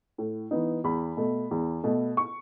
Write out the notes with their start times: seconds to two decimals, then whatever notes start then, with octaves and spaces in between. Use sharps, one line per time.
0.18 A2
0.51 E3 B3 D#4
0.84 E2 B5
1.17 B2 A3
1.51 E2
1.84 B2 A3
2.17 C#6